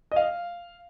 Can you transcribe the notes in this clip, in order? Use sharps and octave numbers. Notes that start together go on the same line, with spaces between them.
D#5
F5